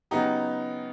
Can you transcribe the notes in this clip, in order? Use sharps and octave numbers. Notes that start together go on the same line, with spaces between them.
C#3 F#3 B3 D#4 G4